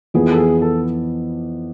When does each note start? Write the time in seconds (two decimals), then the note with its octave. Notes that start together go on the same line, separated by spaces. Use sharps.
0.14 F2 E3 B3 G#4
0.32 A4
0.38 G#4
0.62 A4